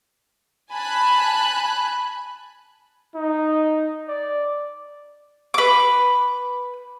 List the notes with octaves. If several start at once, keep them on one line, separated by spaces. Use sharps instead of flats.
G#5 A5 B5 F#6
D#4
D5
B4 D6